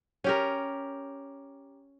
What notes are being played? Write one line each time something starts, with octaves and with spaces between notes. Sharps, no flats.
C#4 G4 A#4